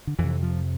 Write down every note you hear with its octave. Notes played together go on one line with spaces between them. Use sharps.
D3
F2 C3 E3
F3